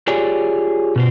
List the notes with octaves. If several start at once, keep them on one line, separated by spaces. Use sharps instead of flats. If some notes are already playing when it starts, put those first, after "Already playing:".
F4 G4 G#4 C#5 D5
B2 F4 C5